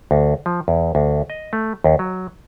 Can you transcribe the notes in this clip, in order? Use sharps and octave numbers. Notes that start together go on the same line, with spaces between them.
D2
F3
E2
D2
D#5
A3
D#2
F#3